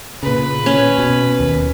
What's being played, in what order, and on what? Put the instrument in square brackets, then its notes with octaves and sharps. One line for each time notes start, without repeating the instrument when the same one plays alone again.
[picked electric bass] A#2 C#3 [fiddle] B4
[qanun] C#4
[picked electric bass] B2
D#2